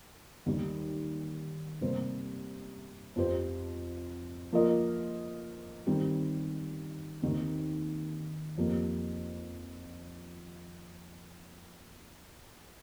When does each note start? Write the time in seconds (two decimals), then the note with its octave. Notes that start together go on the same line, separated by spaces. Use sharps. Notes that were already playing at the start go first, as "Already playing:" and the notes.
0.46 D#2 D#3 G3
1.81 C3 G3 A#3 G4 C5
3.16 F2 F3 C4 G4 C5
4.52 F3 A#3 F4 A#4 D#5
5.87 D#3 G3 C4 G4
7.22 D#2 D#3 C4
8.58 F2 F3 A#3 G4